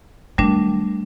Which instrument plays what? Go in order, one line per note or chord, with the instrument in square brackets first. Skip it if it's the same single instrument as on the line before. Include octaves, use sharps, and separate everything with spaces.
[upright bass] D#3 F#3 [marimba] G3 A3 D4